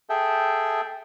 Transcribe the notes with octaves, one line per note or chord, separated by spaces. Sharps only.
G#4 A4 E5 G5